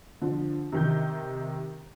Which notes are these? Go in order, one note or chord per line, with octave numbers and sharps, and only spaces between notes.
D3 F3
C3 D#3 G6